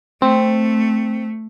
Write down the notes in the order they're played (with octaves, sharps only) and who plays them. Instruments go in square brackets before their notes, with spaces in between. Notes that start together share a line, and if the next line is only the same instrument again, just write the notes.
[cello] A3 [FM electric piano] C4